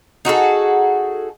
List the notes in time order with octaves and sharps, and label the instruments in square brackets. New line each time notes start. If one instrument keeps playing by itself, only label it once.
[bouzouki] D#4 F#4 G#4 A4